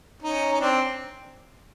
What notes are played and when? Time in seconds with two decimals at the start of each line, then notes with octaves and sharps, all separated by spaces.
0.23 C#4 D#4
0.53 D#4
0.61 C4 D4
0.71 D4